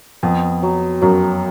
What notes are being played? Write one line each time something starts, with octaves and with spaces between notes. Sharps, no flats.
F2 B3
F#3
F#2 F#3